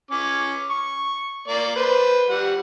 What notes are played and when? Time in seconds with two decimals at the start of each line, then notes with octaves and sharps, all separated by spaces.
0.11 C#4 D6
0.70 C#6
1.48 A#3 D5
1.76 B4 C5
2.29 G3 F#5